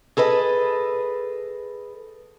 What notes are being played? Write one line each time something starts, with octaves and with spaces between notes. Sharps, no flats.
G#4 A4 B4 D#5